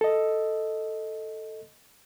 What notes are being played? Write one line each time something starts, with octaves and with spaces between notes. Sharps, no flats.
A4 D#5